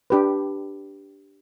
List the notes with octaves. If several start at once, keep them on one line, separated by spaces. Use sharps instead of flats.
D4 G4 B4